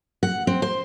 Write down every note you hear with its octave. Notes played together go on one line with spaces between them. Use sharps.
F#5
C4
C5